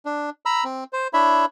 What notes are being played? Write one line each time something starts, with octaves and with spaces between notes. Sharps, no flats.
D4
A#5 B5 E6
C4
C5
D4 E4 C#5 E5 B5